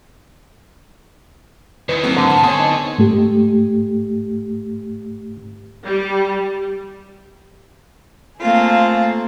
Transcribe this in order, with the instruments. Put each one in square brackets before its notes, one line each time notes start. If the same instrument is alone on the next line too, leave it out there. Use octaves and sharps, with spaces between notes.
[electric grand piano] E2 C#7 [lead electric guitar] D#3 E3 [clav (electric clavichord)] B4
[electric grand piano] F#3 A3 A#3 [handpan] C4
[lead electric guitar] G#2 [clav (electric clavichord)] D3
[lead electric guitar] B2 A5 [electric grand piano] F#5
[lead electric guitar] D3 A4 [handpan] B3 C#5 [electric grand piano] G#5 C6 D#6
[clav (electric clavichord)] D#4
[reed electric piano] G#2 A3 G4
[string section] G3
[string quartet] A3 A#3 C4 F4 G#4